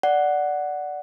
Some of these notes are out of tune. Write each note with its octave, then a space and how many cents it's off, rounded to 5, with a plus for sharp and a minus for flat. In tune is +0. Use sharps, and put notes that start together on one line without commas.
D5 +0 F#5 +0